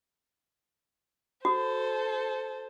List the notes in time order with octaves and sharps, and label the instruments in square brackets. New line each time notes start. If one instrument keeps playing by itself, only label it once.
[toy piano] F#4 [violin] A4 C5